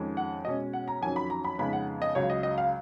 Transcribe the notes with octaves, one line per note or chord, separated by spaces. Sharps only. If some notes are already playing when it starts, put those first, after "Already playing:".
Already playing: F2 D#3 G#3 C#4
F#5
B2 G#3 C#4 D#5
F#5
A#5
F2 D#3 F#3 C#4 G#5
B5
A#5
B5
F2 C#3 G#3 B3 D#4 B5
F#5
D#5
C#2 C#3 F#3 C#5
D#5
D#5
F5